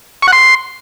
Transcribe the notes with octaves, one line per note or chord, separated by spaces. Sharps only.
C#6
F#5
C6